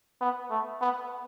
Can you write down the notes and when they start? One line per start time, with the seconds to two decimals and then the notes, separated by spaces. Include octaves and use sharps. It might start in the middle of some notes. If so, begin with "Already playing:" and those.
0.21 B3
0.50 A3
0.81 B3